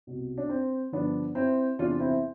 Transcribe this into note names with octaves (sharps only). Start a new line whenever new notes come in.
C2 B2
D4
C4
G2 D3 F3 B3 D4
C4 E4
E2 C3 E3 D4 F4
C4 E4